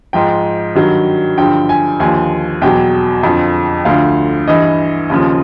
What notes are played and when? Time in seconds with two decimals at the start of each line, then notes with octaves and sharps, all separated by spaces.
0.13 G#2 F3 G5
0.75 G2 D#3 F#3
1.37 G2 D3 F3 G5
1.69 G#5
2.00 D#2 D3 F3 G#5
2.62 E2 B2 F#3 G5
3.23 F2 D3 F3
3.85 D2 D3 F3 F5
4.48 G2 E3 D#5
5.10 D#2 C#3 F3